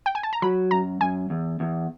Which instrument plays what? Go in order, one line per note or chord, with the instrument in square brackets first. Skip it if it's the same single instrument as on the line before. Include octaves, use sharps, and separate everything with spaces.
[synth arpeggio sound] G5
G#5
A5
A#5
[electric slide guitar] F#3 [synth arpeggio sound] B5
[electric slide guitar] F#2 [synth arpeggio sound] A#5
[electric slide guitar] F#2 [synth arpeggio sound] G#5
[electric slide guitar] E2
E2